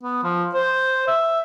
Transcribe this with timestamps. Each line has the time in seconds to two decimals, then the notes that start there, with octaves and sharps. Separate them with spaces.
0.03 B3
0.23 F3
0.54 C5
1.08 E5